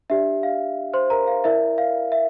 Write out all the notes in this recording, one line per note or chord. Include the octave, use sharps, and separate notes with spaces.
D4 G4 D5 E5
F5
C5 C6
A#4 A#5
F5
E4 A#4 D5 E5
F5
E5